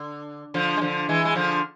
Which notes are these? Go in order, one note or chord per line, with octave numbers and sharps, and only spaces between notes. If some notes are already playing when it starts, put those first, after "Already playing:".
Already playing: D3
D3 F3
G#3
D3 F3
E3 G#3
G#3
D3 F3